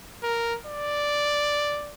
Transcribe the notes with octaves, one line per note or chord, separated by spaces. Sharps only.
A#4
D5